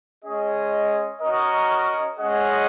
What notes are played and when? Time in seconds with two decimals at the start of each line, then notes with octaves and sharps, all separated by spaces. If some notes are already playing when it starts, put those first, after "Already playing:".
0.24 G#3 C#4 G#4 D#5
1.21 C#4 F#4 A#4 D#5
2.19 G#3 C#4 G#4 D#5 F#5